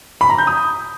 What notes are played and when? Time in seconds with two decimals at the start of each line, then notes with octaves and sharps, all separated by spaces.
0.21 B5
0.30 A#5
0.38 G6
0.47 D#6